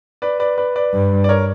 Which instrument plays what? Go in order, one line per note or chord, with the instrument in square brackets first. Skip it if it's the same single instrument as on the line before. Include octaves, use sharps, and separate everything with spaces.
[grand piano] B4 D5
B4 D5
B4 D5
B4 D5
[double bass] G2
[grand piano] D5
A#4 C#5